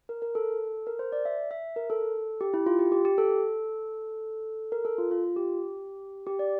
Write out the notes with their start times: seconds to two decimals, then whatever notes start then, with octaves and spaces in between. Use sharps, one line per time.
0.09 A#4
0.22 A#4
0.35 A4
0.87 A#4
0.99 C5
1.12 D5
1.25 E5
1.51 E5
1.76 A#4
1.90 A4
2.41 G4
2.54 E4
2.66 F4
2.79 G4
2.92 G4
3.05 G4
3.18 A4
4.72 A#4
4.85 A4
4.98 F4
5.11 F4
5.24 F4
5.36 G4
6.27 G4
6.39 D5